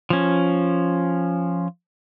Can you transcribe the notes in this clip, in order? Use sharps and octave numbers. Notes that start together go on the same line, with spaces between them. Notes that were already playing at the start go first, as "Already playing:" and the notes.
F3 C#4